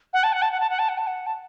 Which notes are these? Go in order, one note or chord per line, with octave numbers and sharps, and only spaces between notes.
F#5
A5
F#5
A5
F#5
A5
F#5
A5
F#5
A5
F#5
A5